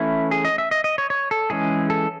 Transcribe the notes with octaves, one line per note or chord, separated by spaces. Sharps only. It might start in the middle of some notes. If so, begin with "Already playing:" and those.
Already playing: E3 A3 C#4 E4
G#4
D#5
E5
D#5
D#5
C#5
C#5
A4
E3 G#3 C#4 G#4
A4